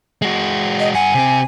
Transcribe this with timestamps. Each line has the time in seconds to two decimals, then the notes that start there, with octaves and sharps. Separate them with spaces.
0.22 G#3 F#4
0.80 D#5
0.94 G2 F#5 G#5
1.15 C3 C4